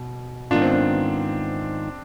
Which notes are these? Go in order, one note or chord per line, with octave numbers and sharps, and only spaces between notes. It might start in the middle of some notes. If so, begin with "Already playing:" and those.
Already playing: B2
G#2 D#3 B3 D4 F4
C4
D4